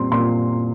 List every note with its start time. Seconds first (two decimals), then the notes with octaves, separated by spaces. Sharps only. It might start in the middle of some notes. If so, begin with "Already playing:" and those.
Already playing: A#2 G3 C4 C6
0.12 A#2 C6